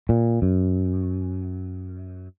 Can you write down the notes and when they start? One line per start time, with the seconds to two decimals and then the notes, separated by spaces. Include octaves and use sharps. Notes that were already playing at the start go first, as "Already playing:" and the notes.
0.09 A#2
0.42 F#2